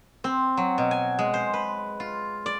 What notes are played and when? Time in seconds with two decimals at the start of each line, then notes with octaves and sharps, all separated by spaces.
0.24 C4
0.57 F#3
0.78 B2
0.91 G#5
1.19 G#3
1.34 C5
1.54 B4
2.00 F4
2.46 D5